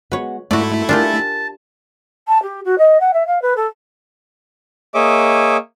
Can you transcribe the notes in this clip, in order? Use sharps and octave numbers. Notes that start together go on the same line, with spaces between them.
G#3 B3 F#4 B4 C#5
G#2 A3 E4 F#4 D5
D4 F4 G4 A#4 G#5 A5
A5
G4
F#4
D#5
F#5
E5
F5
B4
A4
A#3 G#4 C#5 D#5 E5 D6